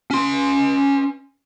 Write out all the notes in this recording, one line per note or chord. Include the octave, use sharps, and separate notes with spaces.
C#4 C6